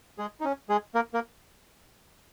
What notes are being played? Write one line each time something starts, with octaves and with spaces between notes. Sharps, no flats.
G#3 G#4
D#4
C#4
G#3 G#4
A#3 A#4
A#3 A#4